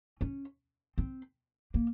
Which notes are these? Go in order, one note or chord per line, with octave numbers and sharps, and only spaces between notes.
C#4
C4
A#3